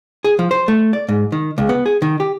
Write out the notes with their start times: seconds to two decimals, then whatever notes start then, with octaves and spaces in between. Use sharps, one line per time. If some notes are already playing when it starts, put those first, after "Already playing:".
0.24 G#4
0.39 F3
0.51 C5
0.68 A3
0.93 D5
1.09 G#2
1.32 D#3
1.58 C#2
1.69 B3
1.86 G#4
2.02 D#3
2.20 G4